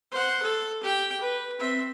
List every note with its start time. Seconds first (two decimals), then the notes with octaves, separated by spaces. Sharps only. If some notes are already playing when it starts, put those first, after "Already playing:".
0.11 C5 F#5
0.42 A4
0.83 G4 G5
1.21 B4
1.59 C4 E5